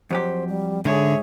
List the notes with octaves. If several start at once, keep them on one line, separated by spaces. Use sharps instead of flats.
F2 F#3 G4 C5
G3
G#2 D3 G#4 C#5 E5